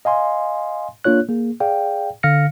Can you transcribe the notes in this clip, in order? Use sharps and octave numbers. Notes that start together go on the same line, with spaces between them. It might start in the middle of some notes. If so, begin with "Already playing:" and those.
D#5 F5 G#5 C6
A#3 D4 F4 C#5 F#6
A#3 G#4
G#4 D5 F5 G5
D3 F5 F6 A#6 C#7